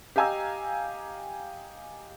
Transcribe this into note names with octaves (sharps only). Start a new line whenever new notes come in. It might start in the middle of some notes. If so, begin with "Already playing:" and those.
G4 D#5 F5 G#5 A#5 E6